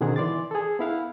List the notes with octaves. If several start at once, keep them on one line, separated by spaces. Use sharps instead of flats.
B2 D3 D#3 C4 G#4 F#5
E3 D5 C6 D6 A6
G#4 A4
B3 E4 F5 F#5